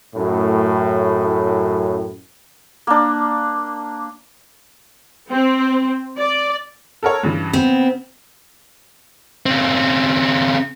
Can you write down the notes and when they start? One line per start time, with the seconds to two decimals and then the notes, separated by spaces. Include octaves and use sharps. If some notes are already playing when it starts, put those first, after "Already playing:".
0.15 F#2 A2
2.87 A#3 D4
5.30 C4
6.18 D5
7.03 A4 A#4 C#5
7.23 G2 C#3 E3
7.53 C#3 B3 C4
9.46 C#3 C4